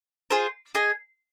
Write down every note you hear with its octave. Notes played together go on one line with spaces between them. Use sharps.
F4 G#4 C5
G#4 D#5 G#5